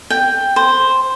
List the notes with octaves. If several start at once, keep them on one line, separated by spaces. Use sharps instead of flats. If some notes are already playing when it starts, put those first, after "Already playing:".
G5
C5